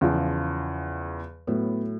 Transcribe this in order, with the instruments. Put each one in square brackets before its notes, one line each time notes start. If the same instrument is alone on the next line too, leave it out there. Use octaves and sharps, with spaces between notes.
[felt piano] E2 C#3 F3
A2 F#3 B3